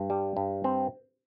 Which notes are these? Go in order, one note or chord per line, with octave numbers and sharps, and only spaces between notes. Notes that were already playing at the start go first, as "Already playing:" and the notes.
Already playing: G2
G3
G2
C4